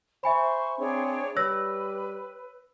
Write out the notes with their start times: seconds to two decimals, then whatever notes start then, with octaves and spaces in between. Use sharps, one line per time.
0.24 C5 E5 G#5 B5 C#6
0.79 C4 D4 G#4 C#5
1.37 G3 B4 C#5 E6 A#6